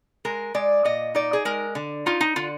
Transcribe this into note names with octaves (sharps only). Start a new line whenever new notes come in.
G#3 A#4
G#3 D5
A#2 D#5
D#4 D5
G#4
G#3 A#4
D3
D#4 F4
D#4
D3 F4